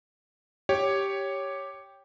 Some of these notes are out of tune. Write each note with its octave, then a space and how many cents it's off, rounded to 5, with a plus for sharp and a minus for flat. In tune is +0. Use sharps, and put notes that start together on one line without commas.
G4 +0 C#5 +0